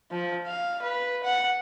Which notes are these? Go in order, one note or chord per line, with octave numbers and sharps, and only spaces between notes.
F3
F5
B4
F#5